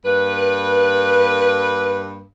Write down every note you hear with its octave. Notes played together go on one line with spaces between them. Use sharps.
G2 A#3 B4